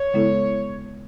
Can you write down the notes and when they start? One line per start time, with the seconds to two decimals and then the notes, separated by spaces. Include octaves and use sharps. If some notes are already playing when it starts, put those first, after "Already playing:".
Already playing: C#5
0.14 C#3 G#3 B3 E4 A4